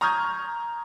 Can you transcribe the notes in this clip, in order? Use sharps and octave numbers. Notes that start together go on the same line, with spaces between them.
A#5 C#6 D#6 F6 G6 G#6